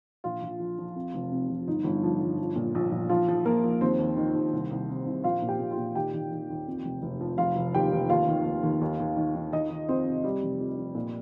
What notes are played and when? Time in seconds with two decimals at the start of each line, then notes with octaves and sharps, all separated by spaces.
0.24 A#1 F4
0.42 A#1
0.60 F3
0.78 F3
0.96 F2
1.14 F1
1.32 C3
1.49 F1
1.68 G1 D#4
1.84 G1
2.03 F3
2.20 G1
2.38 F3
2.56 A#2
2.75 A#1
2.92 A#1
3.09 F3 F4
3.28 F3
3.45 F3 A#3 A#4
3.64 F3
3.81 D#2 C4 C5
3.99 D#2
4.17 D#3
4.34 D#2
4.53 C2
4.71 C2
4.89 C3
5.07 C2
5.24 A#1 F4 F5
5.42 A#2
5.47 G4 G5
5.60 A#2
5.71 F4 F5
5.77 A#2
5.95 D#3 G4 G5
6.14 D#3
6.31 D#3
6.50 D#2
6.67 F2
6.85 F1
7.02 F1
7.21 F3
7.38 F1 F4 F5
7.56 F1
7.75 D#2 G4 G5
7.92 F1
8.10 D#2 F4 F5
8.28 D#3
8.45 D#2
8.63 D#2
8.81 D#2
9.00 D#2
9.16 D#3
9.35 D#3
9.53 D#3 D#4 D#5
9.70 D#3
9.89 F2 C4 C5
10.07 C3
10.24 C3 G3 G4
10.43 F1
10.60 F2
10.78 F2
10.95 A#2